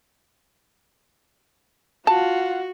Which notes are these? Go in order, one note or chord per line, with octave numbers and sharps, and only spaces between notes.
F4 F#4 F#5 A5